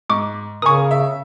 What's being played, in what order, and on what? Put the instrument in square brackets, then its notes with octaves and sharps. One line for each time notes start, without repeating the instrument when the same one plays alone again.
[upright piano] G#2 [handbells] C#6 D6
[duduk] C#3 [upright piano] A#4 G#5 [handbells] C#6 D#6
[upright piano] E5